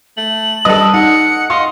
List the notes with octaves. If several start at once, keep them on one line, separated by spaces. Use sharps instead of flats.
A3 F#7
G3 D4 A4 B4 D#5
D#4 F#5 C#7
D#5 F5 C6